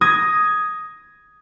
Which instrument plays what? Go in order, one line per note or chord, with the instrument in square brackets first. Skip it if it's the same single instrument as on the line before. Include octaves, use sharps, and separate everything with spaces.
[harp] D#6 G#6 A#6